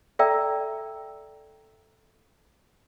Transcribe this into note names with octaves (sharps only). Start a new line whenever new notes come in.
A4 D5 E5 G5 A#5 E6